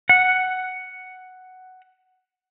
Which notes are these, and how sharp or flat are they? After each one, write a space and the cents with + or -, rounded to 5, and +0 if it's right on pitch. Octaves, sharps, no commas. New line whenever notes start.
F#5 +5